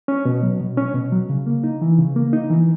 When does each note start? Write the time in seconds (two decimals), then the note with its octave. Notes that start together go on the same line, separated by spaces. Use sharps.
0.08 C#4
0.25 B2
0.43 F#3
0.60 B2
0.77 C#4
0.94 B2
1.12 F#3
1.29 C#3
1.46 A#3
1.64 D#4
1.82 E3
1.98 C#3
2.16 A#3
2.33 D#4
2.50 E3